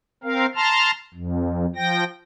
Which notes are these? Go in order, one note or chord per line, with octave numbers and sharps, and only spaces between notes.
C4 A#4 F5
A5 A#5 C6 F6
F2
F3 G5 A#6